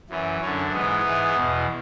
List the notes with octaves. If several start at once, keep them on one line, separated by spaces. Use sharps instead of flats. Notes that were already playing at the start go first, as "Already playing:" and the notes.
F#2 E3
F#2 D3 C#4
G#2 E3 B3
G#2 E3
E2 B2